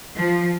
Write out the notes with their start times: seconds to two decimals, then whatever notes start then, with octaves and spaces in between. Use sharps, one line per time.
0.16 F3